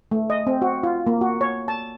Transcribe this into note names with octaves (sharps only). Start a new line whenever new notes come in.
A3
D#5
C4
F#4
F4
A#3
F#4
C#5
A5